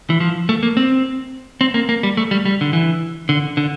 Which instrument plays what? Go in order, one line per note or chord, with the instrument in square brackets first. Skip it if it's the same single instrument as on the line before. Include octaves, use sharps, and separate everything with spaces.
[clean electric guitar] E3
F3
A3
A#3
C4
C4
A#3
A#3
G3
A3
G3
G3
D3
E3
D3
D3